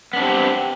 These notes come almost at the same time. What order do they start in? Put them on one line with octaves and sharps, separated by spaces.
B3 D4 C4 G4